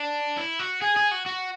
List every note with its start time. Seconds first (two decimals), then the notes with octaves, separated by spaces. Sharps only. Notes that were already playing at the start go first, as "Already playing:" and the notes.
Already playing: D4
0.37 E4
0.59 F#4
0.82 G#4 G#5
0.97 G#4
1.11 F#4
1.26 F#4